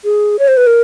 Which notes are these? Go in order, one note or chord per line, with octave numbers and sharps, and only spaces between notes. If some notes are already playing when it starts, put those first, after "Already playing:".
G#4
C#5
C5
B4
A#4